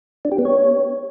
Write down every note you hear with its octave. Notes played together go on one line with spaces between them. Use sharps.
D4
G4
B3
C#5